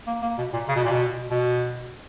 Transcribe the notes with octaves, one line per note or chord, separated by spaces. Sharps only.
A#3
A#3
B2
A#2
C#3
B2
A#2
B2
B2